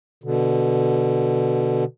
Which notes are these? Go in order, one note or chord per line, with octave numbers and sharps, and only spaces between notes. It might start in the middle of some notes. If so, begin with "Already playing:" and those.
B2 D3